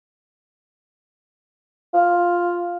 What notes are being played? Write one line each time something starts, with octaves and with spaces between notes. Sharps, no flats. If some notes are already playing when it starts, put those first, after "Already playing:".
F4